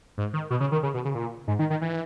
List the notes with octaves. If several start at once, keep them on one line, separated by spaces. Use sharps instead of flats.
G#2
D#3
B2
C#3
D#3
C#3
B2
C#3
A#2
G#2
D#3
D#3
E3